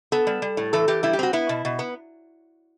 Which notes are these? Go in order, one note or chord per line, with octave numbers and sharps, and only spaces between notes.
B3 A4
G3
G3
A2
E3 A4
E3 G4
G3 E4
G4
C4 F#4
B3 E4
B2
B2
B3